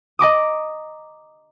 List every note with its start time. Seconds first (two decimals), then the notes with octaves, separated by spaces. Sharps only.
0.19 D#5 A#5 D6 D#6